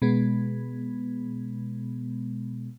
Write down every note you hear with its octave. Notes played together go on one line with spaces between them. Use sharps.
B2 G#3 B3